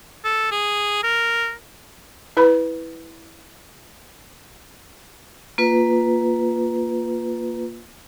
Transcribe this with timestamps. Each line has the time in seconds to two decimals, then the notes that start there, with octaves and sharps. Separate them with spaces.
0.25 A4
0.52 G#4
1.03 A#4
2.37 E4 B4 B5
5.58 A#3 F4 B4